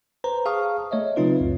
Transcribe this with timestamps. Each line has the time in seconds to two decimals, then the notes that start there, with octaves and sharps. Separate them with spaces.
0.24 B4 C5 A#5
0.45 G#4 F5 A5 C#6 D#6 F6
0.91 A3 C#5 D#5 E5
1.16 C#3 F#3 C4 D#4 F4 B4
1.41 C#2 F#2